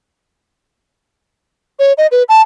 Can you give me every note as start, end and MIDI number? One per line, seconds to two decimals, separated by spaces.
1.79 1.93 73
1.98 2.07 75
2.11 2.23 71
2.29 2.42 81